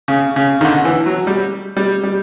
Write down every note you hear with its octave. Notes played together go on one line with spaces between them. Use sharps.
C#3
C#3
D#3
D3
E3
F#3
G3
G3
G3